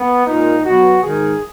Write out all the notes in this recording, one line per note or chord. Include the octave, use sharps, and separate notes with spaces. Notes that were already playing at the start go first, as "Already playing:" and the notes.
Already playing: B3
A#2 G#3 D#4
B2 F#3 F#4
G#2 D#3 G#3 G#4